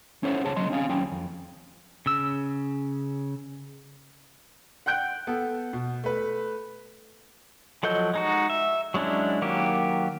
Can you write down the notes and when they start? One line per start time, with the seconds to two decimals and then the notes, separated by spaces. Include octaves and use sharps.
0.23 C#4 E4 A4 C5 C#5 F#5
0.44 C#2 G#4 C#5 A5
0.56 C#2 F#3 D#5 C6
0.70 C4 C#4 E4 F5 G#5
0.89 D#2 F#3 C#4 G5
1.11 F2
2.06 C#3 E6
4.86 F#5 G5 F#6 G6 D7
5.27 B3 A4
5.73 B2
6.04 A3 B4
7.83 F3 F#3 A4 D#5 G6
8.14 G#3 D#4 F#4
8.50 E5
8.94 F#3 G#3 C#4 D4 E4
9.42 D#3 F#3 A#3 G4